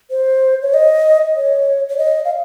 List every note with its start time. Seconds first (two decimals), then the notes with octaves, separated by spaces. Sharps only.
0.11 C5
0.62 C#5
0.74 D#5
1.36 C#5
1.90 C#5
1.98 D#5
2.25 F5